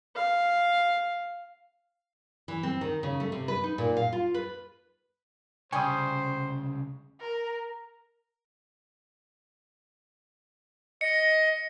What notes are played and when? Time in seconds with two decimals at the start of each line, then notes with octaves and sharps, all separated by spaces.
0.16 F5
2.48 E3
2.63 C4
2.81 D#3
3.03 C#3
3.20 A3
3.32 C3
3.48 B4
3.64 D#4
3.78 A#2
3.97 F5
4.13 F4
4.34 B4
5.72 C2 C#3 G3 C5 G#5 C#6 D#6
7.19 A#4
11.01 D#5 C#7